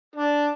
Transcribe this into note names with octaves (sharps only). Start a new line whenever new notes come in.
D4